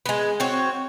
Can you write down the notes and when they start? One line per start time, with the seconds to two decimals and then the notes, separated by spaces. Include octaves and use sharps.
0.06 G#3 B3
0.40 C4 F#4 C#5